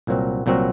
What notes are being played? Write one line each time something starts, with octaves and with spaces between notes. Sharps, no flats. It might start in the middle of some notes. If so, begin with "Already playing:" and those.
C2 A#2 F#3 C4 F#4
C2 A#2 F#3 C4 F#4